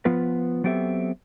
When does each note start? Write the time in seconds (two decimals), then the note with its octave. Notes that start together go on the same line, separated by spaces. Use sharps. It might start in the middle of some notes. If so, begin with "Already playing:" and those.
0.05 F3 B3 F4 B4
0.64 F#3 B3 C4 G4 A4 E5